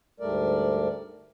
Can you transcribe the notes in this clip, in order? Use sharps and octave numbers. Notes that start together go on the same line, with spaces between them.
D2 G#2 G3 A3 A#4 D5